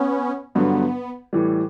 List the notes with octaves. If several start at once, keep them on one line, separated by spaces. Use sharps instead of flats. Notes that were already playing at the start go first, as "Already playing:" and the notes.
Already playing: B3 C#4
G2 D3 F#3 B3
A2 E3 G3